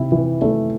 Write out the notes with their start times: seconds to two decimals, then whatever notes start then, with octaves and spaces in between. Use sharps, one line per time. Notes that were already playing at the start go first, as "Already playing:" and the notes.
Already playing: C3 E4
0.12 E3
0.42 A3